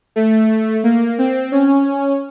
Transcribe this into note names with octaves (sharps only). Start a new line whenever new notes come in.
A3
A#3
C4
C#4